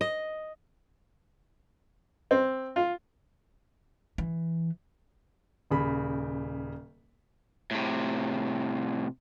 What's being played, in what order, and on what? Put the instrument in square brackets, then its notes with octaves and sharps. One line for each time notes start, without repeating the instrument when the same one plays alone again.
[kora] D#5
[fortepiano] C4
F4
[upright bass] E3
[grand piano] D#1 C#3 B5
[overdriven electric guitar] A2 C3